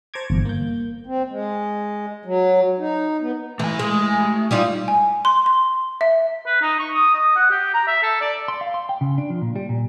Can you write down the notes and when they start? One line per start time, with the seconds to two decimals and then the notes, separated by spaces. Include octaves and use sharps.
0.14 C5 A5 A#5 C#6 D6 G#6
0.30 G1 E2
0.45 A#3 G6
1.07 C4
1.30 G#3
2.25 F#3
2.78 D#4
3.21 B3
3.59 E3 A3 G#5
3.79 G#3
4.51 G3 D#4 F4
4.88 G#5
5.25 C6
5.46 C6
6.01 E5
6.46 B4
6.62 D#4
6.80 C#6
6.95 D#6
7.14 D#5
7.36 F#5
7.51 G4
7.74 A#5
7.87 E5
8.03 A4
8.21 D5
8.48 C6
8.61 F5
8.74 C6
8.89 G5
9.01 C#3
9.18 D4
9.30 F3
9.42 A#2
9.56 G3
9.69 A#2